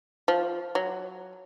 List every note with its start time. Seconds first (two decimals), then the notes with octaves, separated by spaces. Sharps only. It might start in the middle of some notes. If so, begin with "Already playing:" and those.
0.28 F3
0.75 F#3